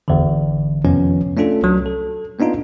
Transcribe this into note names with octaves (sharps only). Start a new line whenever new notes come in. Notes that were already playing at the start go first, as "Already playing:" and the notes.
G#1 E2 D3
F2 C3 D#3 F3 B3 C#4
A3 C#4 D4 F4 A4
C2 F#3
A4
A#3 B3 D4 D#4 F4